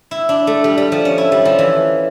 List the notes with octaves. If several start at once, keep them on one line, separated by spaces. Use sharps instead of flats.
E4
D4
A3
G3
G3
F3
C#4
E4
G3
F3
E3